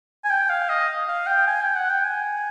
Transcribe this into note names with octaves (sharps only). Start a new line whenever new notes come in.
G#5
G5
F5
D#5
F5
G5
G#5
G5
F#5
G5
G#5